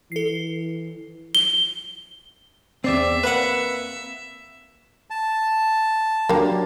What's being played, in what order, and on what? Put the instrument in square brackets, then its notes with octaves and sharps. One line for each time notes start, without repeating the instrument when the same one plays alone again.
[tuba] E3 [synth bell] A4 C7
[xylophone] G7
[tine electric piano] E2 D5 C7 [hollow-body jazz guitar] C4 [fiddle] E5
[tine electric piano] A#3 [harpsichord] B4 F#5
[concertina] A5
[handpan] F#3 D4 [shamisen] A#3 G4